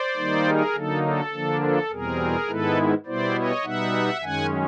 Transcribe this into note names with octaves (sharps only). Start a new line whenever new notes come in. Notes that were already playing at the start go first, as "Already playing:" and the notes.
Already playing: C5 D5
D#3 G3 A#3 D#4
G#4 A#4
D3 F#3 A#3 D#4 A4
A4
D3 F3 A#3 D4
A4
E2 B2 G3 C4 G#4 A#4
G#2 D#3 G#3 B3 E4 A4 B4
B2 G3 B3 E4 C5 D5
C#5 D#5
B2 G3 B3 D#4 E5 F#5
F#2 D#3 G#3 C#4 F#5 G#5